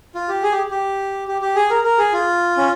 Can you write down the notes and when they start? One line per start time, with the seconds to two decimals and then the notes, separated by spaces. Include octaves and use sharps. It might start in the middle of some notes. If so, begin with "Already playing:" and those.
0.15 F4
0.28 G4
0.43 G#4
0.52 G4
0.71 G4
1.28 G4
1.41 G4
1.56 G#4
1.70 A#4
1.84 A#4
1.98 G#4
2.13 F4
2.57 C#4